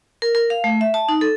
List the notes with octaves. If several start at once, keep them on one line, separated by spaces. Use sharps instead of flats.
A#4
A#4
F5
A3
E5
A5
D#4
A4